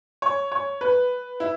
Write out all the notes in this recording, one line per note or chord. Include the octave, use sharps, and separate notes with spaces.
C#5
C#5
B4
E4